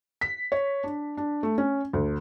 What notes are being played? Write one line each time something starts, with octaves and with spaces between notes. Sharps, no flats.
B6
C#5
D4
D4
A3
C#4
D2